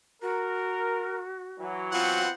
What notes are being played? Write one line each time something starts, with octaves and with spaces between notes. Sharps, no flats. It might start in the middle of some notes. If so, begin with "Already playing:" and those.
F#4 A#4
E3 F#3
B3 C4 F4 F#5